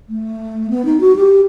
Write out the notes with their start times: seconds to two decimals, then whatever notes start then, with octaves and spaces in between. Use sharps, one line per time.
0.09 A3
0.70 B3
0.85 D#4
1.01 F#4
1.16 G4